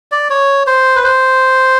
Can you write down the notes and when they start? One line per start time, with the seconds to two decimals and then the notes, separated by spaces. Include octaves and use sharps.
0.12 D5
0.30 C#5
0.67 C5
0.96 B4
1.04 C5